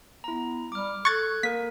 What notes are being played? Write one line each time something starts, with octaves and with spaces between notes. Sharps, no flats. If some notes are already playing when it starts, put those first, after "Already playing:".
B3 E4 A#5
G3 D6 F6
A4 C#6 F#6 G#6 A6
A#3 A#4 B6